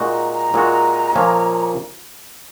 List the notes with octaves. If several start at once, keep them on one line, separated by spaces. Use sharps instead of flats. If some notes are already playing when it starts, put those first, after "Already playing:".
Already playing: A#2 G#3 D#4 F#4
A#5
A#5
A#2 G#3 D#4 F#4
A#2 F3 A#3 C#4